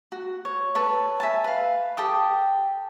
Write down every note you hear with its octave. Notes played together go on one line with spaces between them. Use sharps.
F#4
C#5
A4 B4 C#5
E5 G#5 A5
B4 F5
G4 A4 G5 D#6